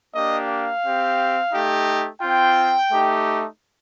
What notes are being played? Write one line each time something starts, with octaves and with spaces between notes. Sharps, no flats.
A#3 D4 G4 D#5
F5
C4 G4
A3 D#4 G4
C4 F4 G5
A3 D#4 G4